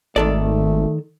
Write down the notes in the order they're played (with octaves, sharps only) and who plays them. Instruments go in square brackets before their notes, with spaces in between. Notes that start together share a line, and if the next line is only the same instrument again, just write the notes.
[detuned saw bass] G#1 [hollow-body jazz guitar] D#3 A4 D5 [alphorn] A3